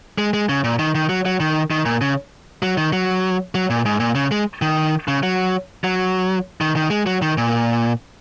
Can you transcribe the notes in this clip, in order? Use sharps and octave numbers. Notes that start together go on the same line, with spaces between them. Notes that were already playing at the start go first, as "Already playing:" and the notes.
G#3
G#3
C#3
A#2
D#3
D#3
F#3
F#3
D#3
D#3
A#2
C#3
F#3
D#3
F#3
F#3
A#2
G#2
A#2
C#3
G#3
D#3
C#3
F#3
F#3
D#3
D#3
G#3
F#3
D#3
A#2